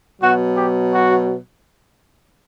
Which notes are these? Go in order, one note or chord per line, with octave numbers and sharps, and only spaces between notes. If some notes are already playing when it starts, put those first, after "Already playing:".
B2 F#3 F#4
G4
F#4